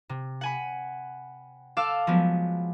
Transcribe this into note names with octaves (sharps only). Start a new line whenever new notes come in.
C3
F#5 G#5 B5
A4 F5 D6 E6
F3 F#3 G#3 B3